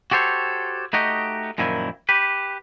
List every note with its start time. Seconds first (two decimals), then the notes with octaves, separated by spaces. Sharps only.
0.11 F#4 G4 A4 C5 C#5
0.93 A3 D#4 F#4 G4 D#5
1.58 F#2 A#2 D#3 F3 E4
2.09 G4 B4